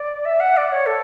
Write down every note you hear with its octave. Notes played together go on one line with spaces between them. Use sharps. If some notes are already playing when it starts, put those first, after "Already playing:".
Already playing: D5
E5
F#5
D5
C#5
A4